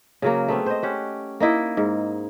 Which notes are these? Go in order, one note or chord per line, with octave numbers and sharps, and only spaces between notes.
C#3 F#3 A#3
A3 B3 C4
C5 D#5
C#4 G4 F#5
A#3 D#4 E4 D#5
G#2